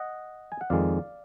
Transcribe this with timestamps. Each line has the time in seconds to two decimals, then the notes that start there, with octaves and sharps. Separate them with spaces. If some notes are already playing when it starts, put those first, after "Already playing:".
Already playing: D#5 F#5
0.52 G#5
0.61 F#5
0.70 F2 D#3 G#3 D5 F5